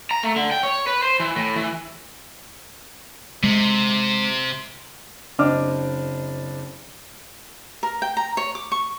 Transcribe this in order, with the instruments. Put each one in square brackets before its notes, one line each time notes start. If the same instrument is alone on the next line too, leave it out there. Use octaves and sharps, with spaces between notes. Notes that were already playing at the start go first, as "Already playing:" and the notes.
[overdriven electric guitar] A#5
A3
D3
G5
C#5
B4
C5
E3
A2
E3
[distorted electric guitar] C3 [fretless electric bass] G#3
[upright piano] F#1 C4 D4 D#5 D6 F6
[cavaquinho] A#4
G5
A#5
C#5
D6
C#6